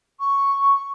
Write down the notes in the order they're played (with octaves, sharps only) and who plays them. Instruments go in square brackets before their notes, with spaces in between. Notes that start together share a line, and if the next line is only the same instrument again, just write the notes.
[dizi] C#6